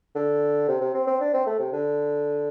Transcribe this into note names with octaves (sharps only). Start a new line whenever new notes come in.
D3
C3
C3
C4
C4
D4
C4
A3
C3
D3